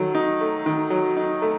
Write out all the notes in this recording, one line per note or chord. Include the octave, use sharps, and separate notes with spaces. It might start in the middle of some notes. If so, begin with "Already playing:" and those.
Already playing: D#3 F#3 A3
D#4
A3
D#3
F#3
D#4
A3